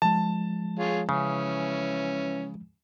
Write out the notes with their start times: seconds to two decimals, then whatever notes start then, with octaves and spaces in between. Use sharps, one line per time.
0.02 F3 G#3 A5
0.79 F4 G#4 C#5
1.09 C#3 E3 C#4